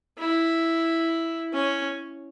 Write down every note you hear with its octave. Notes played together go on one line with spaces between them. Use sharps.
E4
C#4